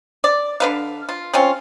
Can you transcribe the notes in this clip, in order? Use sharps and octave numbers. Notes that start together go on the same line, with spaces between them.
D5
D3 B4 F5
F4
C4 C#4 F4